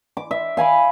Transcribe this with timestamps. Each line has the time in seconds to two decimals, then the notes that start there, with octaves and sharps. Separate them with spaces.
0.17 D6
0.31 E5
0.57 F5 G#5 B5 D6